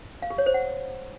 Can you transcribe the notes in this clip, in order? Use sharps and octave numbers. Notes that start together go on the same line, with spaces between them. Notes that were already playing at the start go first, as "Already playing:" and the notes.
F5
G4
C#5
C5
F#5